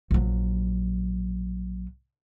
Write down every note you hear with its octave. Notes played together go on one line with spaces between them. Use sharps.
A#1 F#3